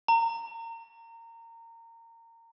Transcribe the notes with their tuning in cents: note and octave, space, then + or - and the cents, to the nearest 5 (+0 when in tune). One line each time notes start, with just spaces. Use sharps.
A#5 -25